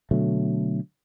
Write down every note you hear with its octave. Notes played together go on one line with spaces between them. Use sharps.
B2 D3 F#3 A3